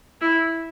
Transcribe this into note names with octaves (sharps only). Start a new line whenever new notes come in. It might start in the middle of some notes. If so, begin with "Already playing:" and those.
E4